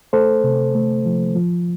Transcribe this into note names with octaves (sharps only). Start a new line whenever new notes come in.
A3 A4 C5
C3
A3
F3
F3